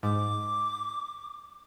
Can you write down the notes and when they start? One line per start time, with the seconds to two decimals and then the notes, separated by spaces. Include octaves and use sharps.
0.03 G#2 D6